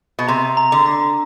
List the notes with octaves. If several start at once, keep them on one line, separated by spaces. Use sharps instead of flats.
B2
C3 A#5
A#5
D3
A#5